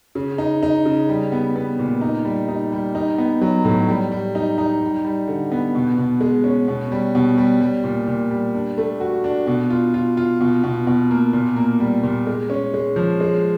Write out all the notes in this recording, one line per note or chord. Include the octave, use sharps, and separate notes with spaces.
C#3
D#4
D#4
C#3
G3
B3
B3
A#2
D#4
G3
D#4
G3
D#4
B3
F#3
A2
G3
G3
D#4
D#4
G3
G3
D3
B3
B2
B2
G#3
C#4
B2
G3
B2
G3
G3
A#2
A#2
G3
D4
A3
F#4
D4
B2
F4
F4
F4
B2
B2
B2
A#3
A#2
A#3
G3
A#2
G#3
C#4
G#3
F3
G#3